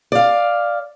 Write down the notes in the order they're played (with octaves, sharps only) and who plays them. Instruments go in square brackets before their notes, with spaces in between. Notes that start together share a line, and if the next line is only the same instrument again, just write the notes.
[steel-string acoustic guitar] D5 F5